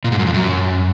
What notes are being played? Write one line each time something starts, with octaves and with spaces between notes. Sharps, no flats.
A#2
G#2
F#2
F2
F#2